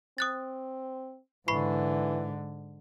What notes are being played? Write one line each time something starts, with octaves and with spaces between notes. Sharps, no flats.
C4 D#6 F#6 A6
G#2 D3 E3 B5 C#6 C7